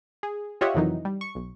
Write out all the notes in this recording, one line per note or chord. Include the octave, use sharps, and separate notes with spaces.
G#4
F4 G4 C#5 D#5 E5 F#5
F2 C3 D#3 E3 F#3 D#4
G3
C#6
B1